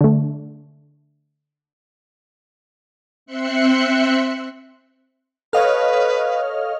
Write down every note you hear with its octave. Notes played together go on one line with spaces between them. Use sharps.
D3 A3
C4 E5 C6 F#6 C#7
A4 B4 C#5 D#5 F5 F6